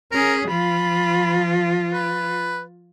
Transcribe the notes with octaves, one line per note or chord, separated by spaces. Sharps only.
C#4 G#4 A#4
F3 F4 B5
B4